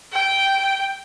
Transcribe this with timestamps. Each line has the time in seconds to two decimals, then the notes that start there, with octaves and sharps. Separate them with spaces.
0.13 G5